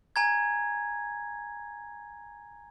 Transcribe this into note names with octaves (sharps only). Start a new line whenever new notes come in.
G#5 A#5 G#6